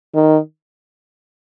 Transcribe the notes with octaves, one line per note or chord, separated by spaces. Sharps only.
D#3